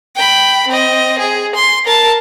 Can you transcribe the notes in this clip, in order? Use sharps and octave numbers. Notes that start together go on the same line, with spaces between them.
G5 B5
C4 D#5
G#4
C6
A#4 A5